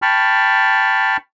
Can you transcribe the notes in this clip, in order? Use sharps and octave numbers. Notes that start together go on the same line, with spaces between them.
G5 A5 B5 C#6 F6